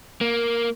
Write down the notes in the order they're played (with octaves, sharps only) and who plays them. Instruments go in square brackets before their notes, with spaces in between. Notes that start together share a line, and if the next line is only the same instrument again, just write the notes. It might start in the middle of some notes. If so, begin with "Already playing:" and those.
[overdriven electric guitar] A#3